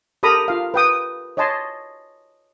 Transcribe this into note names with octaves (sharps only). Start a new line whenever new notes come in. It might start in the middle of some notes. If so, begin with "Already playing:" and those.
G4 A4 A#4 A#5 B5 D#6
F4 F5
B4 G5 D#6
C#5 D#5 G#5 A5 C6